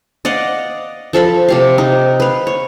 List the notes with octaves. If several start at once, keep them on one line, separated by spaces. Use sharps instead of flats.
D5 D#5 F5 F#5
F3 A4 F5 B5
C3 G4 F5
D#4
B4 F5
C#5